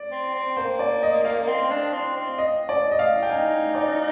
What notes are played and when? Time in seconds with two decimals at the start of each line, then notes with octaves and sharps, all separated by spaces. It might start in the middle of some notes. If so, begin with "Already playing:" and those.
Already playing: D5
0.11 C4
0.34 C4
0.57 A#3 C5
0.79 D5
1.03 D#5
1.25 F5
1.47 C4
1.71 D4
1.93 C4
2.16 C4
2.38 D#5
2.69 D5
2.91 D#5
2.99 F5
3.23 G5
3.29 D#4 G#5
3.75 D5